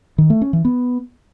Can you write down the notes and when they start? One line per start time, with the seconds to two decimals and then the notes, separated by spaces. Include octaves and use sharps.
0.18 D#3
0.30 A3
0.41 C#4
0.53 E3
0.65 B3